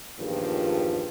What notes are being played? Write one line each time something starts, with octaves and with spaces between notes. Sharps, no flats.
E2 G2 A#2 D#3 F3 G#4